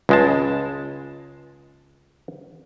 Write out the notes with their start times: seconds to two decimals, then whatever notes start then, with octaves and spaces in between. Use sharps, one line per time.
0.09 C#2 G#3 A5